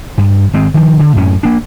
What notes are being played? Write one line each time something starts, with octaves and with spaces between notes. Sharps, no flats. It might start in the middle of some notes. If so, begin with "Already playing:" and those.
G2
G#1 G#3 C4
D#3 F3
D3
F#2 A2 C#4
A#3 D4